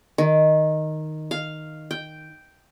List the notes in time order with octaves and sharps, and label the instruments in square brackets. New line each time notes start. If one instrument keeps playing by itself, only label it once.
[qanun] D#3
F5
G5